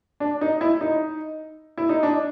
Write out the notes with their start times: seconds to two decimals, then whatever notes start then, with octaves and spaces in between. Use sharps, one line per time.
0.20 D4
0.41 D#4
0.61 E4
0.81 D#4
1.77 E4
1.89 D#4
2.03 D4